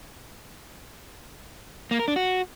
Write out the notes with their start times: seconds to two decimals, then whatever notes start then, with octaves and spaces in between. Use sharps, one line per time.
1.91 A#3
1.99 A#4
2.08 D4
2.16 F#4